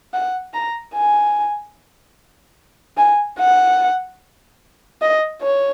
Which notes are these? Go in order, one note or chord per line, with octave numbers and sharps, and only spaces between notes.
F#5
A#5
G#5
G#5
F#5
D#5
C#5